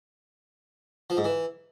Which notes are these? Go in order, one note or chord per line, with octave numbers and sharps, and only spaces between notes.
F3
G#2
E3